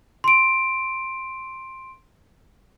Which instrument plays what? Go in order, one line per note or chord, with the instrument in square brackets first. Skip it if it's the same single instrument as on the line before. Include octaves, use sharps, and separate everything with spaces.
[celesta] C6 D7